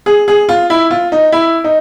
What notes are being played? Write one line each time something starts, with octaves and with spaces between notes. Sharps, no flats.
G#4
G#4
F4
E4
F4
D#4
E4
D#4